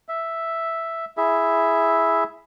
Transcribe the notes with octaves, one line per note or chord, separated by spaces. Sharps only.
E5
E4 G#4 E5